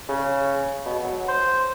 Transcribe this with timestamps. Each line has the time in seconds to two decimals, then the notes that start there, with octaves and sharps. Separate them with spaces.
0.09 C#3
0.85 B2
1.03 F#3
1.29 C5